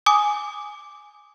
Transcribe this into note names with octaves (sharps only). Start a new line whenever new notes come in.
G#5 D6 D#6